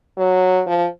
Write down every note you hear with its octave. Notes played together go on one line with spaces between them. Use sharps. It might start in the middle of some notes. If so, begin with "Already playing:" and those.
F#3
F3